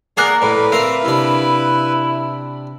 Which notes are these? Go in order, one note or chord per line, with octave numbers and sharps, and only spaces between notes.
A#3 G#4 A#4 D5 F#5 F#6
A#1 A2 B4
C4 A#4 E5 F5
C3 D4 E4